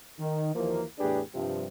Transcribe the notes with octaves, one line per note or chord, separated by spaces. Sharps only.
D#3
D#2 E3 F3 A#3
E2 A2 D4 G4 G#4 B4
G2 C3 F3